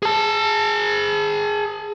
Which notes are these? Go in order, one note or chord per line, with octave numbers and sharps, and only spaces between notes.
G#4 A5